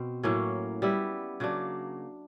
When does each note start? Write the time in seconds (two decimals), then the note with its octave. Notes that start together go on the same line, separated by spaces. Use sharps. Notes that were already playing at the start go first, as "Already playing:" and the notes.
Already playing: B2 C4
0.23 A2 F#3 A#3 C#4
0.82 G3 B3 E4
1.40 C#3 F#3 A#3 D4